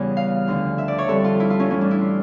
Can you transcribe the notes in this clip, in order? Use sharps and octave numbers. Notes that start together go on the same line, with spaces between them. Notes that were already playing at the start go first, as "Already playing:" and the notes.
Already playing: E2 C#3 G3
F5
D2 D3 F3
E5
D5
C#5
F2 D3 G3 A4
F4
E4
F4
C#4
A2 E3 G3 C#4
D4
E4
F4